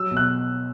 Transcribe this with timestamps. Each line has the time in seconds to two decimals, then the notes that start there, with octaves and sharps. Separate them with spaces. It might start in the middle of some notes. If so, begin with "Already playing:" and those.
Already playing: F#3 E6
0.11 B2
0.17 F#6